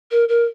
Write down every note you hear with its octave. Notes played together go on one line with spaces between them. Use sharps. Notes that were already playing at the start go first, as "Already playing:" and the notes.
A#4
A#4